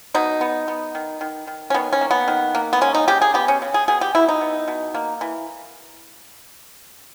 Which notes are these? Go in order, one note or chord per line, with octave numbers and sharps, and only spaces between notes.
B2 D#4
B3
B3
D#3
D#3
D#3
C#4
D#3 B3
C#4
A#3
B3
D#3
A#3
B3
G#3 C#4
D#4
C#3 G4
G#4
B3 G4
C#4
C#3
G#4
B2 G#4
G4
B2 E4
D#4
B3
B2
A#3
E3